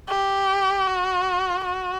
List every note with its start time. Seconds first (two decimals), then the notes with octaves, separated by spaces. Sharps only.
0.09 G4
0.87 F#4
1.65 F#4